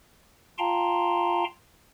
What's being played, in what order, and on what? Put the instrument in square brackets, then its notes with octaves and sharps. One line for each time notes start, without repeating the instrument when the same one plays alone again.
[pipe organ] F4 F5 G5 A5 A#5 C6